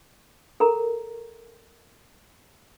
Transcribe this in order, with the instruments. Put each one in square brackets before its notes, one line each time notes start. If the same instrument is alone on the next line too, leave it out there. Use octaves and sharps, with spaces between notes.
[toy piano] A4 A#4 A#5